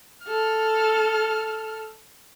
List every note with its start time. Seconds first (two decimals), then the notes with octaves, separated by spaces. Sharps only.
0.24 A4 F6